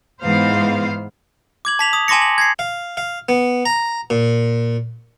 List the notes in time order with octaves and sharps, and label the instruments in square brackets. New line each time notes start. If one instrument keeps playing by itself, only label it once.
[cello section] G#2 E3 B3 C5 F5
[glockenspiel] D6 G#6 F#7
A5 B6 F7 F#7
D#6
G#5 A5 C6 D6 A#6 C#7
F#7
G#6 A#6 C7
[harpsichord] F5
F5
B3
A#5
A#2